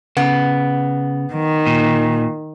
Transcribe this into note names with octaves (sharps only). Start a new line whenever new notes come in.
C#3 B3
D#3
A#2